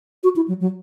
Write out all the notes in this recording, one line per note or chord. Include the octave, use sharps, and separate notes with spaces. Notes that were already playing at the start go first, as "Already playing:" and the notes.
F#4
E4
F#3
F#3